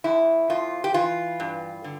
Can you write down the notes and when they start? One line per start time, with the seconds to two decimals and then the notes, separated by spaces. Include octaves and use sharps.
0.04 F2 E4
0.50 F2 F4
0.84 G4
0.94 E3 F4
1.40 G2
1.84 D3